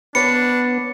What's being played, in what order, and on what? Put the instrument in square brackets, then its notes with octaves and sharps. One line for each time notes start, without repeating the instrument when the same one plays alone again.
[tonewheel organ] B3 [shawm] D4 [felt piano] C#5 B5 [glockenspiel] C#7